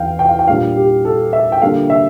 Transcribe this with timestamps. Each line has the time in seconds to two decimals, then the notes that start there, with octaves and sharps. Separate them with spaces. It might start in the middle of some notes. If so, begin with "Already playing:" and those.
Already playing: E2 E3 F5 G5
0.19 G5
0.29 F5
0.39 G5
0.48 A#2 G3 D4 F4 F5
0.76 G4
1.05 A4
1.33 E5
1.52 G5
1.62 D3 G3 A#3 F4 F5
1.90 E5